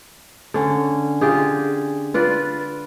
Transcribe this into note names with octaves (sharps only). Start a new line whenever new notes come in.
D3 C#4
F4 G4 G#4
F4 B4 D5